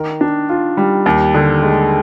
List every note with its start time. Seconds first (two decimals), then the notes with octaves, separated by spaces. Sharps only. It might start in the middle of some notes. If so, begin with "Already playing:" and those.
Already playing: D#3 A#4
0.21 D4
0.49 F4
0.77 G3
1.06 D#2
1.34 D3
1.63 G#3